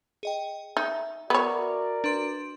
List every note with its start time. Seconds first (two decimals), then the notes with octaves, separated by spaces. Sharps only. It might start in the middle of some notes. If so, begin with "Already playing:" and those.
0.23 G#4 D#5 G5
0.77 D#4 E5
1.30 B3 F#4 A#4 C#5 D5
2.04 D4 B4 C6